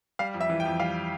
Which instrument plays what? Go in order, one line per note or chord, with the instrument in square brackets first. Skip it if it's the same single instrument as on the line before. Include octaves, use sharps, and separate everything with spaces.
[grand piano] G3 F5
F2
E5
E3
G5
F2
G3 F5